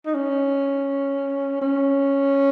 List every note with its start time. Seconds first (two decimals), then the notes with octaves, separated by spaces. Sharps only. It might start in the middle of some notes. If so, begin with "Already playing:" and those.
0.05 D#4
0.14 C#4
1.61 C#4